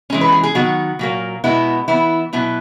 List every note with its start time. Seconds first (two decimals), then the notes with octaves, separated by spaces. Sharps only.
0.10 E3 G#3 C#4
0.21 B4
0.32 G#4
0.43 G#4
0.55 D#3 F#3 B3 F#4
0.99 A#2 F#3 A#3
1.44 B2 G#3 B3 E4
1.88 E3 B3 E4
2.33 B2 F#3 B3 E4